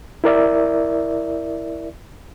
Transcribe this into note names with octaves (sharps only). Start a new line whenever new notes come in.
E4 A#4 D5 E5